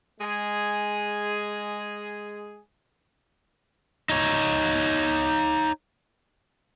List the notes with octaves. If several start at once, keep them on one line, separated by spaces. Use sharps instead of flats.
G#3 G#4
D#4 C#5